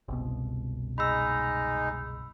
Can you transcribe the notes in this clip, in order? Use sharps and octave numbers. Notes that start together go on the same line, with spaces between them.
F#1 C2 B2
G#3 D#4 B5 E6